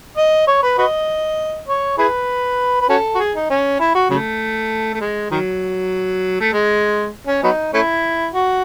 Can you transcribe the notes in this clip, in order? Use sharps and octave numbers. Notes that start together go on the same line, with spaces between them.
D#5
C#5
B4
F#4 B4 D#5
C#5
E4 G#4 B4
B4
C#4 F#4 A4
F#4
G#4
D#4
C#4
E4
F#4
C#3 F#3 A3
A3
G#3
D#3 F#3
A3
G#3
C#4
F#3 B3 D#4
A3 C#4 E4
F#4